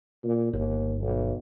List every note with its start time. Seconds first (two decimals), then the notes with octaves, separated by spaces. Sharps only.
0.24 A#2
0.53 G1 D#2
1.01 B1